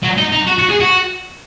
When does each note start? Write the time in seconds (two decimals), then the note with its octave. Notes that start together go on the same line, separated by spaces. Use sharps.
0.03 F#3
0.18 D#4
0.32 D#4
0.47 F#4
0.59 F#4
0.69 G#4
0.80 F#4